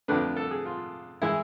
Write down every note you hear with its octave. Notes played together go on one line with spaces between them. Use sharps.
F2 D3 A3 D4 B4
A4
G#4
F4
E3 G#3 E4